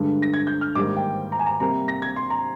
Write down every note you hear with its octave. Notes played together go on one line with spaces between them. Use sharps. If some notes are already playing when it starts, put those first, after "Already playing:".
Already playing: G2 D3 G#3
A#6
G#6
G6
F6
G#2 D#3 G3 A#3 D6
G5
A#5
G#5
A#5
C3 G3 A#3 A#5
A#6
G#6
C6
A#5